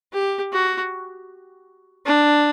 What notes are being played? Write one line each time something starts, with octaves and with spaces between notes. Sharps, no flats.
G4
F#4
D4